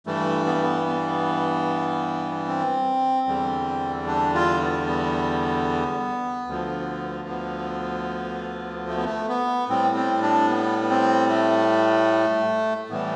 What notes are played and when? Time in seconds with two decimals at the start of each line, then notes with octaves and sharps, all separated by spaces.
0.06 G2 E3 G3 A3
0.46 B3
0.54 A3
0.63 B3
0.87 B3
2.47 C4
3.27 E2 D3 G3
4.07 D4
4.34 F4
4.61 B3
4.88 B3
6.47 D2 D3 F3
7.29 B3
8.88 A3
8.97 B3
9.05 A3
9.29 B3
9.69 A2 G3 C4
9.96 C4
10.23 D4
10.49 B3
10.82 B3
10.89 C4
11.29 A3
12.90 A2 E3 G3 B3